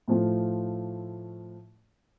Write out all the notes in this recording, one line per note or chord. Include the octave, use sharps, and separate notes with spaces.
A2 F3 A3 F4